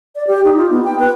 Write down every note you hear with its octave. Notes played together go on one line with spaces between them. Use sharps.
D5
G4
D#4
F4
B3
G5
B4